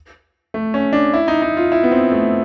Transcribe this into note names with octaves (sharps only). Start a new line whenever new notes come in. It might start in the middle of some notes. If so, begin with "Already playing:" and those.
A3
C#4
D4
E4
D#4
D#4
F4
E4
B3
C4
A3